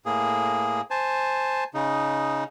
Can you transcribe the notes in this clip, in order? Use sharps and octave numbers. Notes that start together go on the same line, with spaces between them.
A2 A#3 G#4
C5 G#5 A5
C#3 D#4